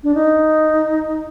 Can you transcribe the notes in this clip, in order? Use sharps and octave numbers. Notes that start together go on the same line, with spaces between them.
D4
D#4